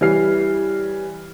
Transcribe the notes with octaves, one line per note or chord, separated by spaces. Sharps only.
E3 G3 C#5 F6 C7